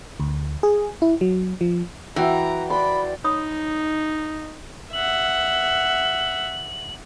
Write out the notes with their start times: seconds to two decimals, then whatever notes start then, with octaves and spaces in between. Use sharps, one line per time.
0.20 D2
0.63 G#4
1.02 E4
1.21 F#3
1.61 F3
2.16 E3 F#4 G5 A#5
2.70 D5 B5 C6
3.24 D#4 C#5 B5 D#6
4.93 E5 F#5 F#7